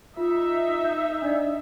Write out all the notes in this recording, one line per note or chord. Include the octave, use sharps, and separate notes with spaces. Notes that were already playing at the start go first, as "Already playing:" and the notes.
D#4 F4 E5
G6
D4 D5 D#5